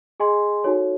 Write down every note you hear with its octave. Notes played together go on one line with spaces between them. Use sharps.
G#4 D#5 G#5 C6
D#4 F#4 A4 C#5